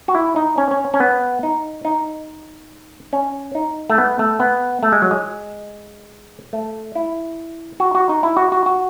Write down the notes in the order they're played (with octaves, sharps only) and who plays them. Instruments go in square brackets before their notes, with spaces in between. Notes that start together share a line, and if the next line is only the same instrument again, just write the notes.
[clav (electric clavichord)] F#4
E4
D#4
C#4
C#4
C#4
B3
D#4
D#4
C#4
D#4
A3
B3
A3
B3
A3
G#3
F#3
G#3
A3
E4
F#4
F#4
D#4
E4
F#4
F#4
F#4